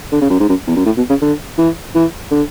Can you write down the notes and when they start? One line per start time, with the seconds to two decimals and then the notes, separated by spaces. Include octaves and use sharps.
0.12 D3
0.21 C#3
0.30 F#2
0.40 G#2
0.49 F#2
0.67 E2
0.76 F#2
0.86 A2
0.97 B2
1.09 C#3
1.21 D3
1.58 E3
1.95 E3
2.31 D3